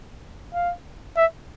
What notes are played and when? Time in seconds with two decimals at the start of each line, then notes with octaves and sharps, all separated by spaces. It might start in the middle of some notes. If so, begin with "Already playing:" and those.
0.54 F5
1.16 E5